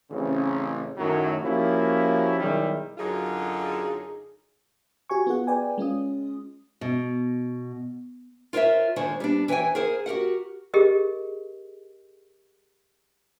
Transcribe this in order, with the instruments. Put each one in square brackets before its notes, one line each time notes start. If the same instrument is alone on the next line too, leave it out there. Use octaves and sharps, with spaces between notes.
[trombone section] A1 C#3 C4
F#2 A2 D#3 F#3 A3 F#4
F3 A#3 C#4 E4 F#4 G4
B1 D#3 F#3 G3 E4 G#4
[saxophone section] F#2 D3 F#3 D#4 F4 G#4
[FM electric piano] F#4 G4 G#5 C#6
B3 F4 G#4 F#5
B4 D5 G5 G#5
G#3 C#4 F4 D#6
[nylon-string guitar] B2
F4 A#4 C5 C#5 E5
D3 D#3 G#3 F4 C5 C#5
G3 B3 D4
E3 B4 C#5 G5 G#5
G#4 A#4 C5 F#5
F#4 G4 A#4 F#5
[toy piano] G4 G#4 A#4 D#5